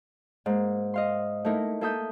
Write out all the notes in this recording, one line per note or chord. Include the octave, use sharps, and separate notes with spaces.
G#2 A#3
D#5 F5 C6
A3 A#3 D#4 E4 A#4
A#3 A4 E5 D#6 G6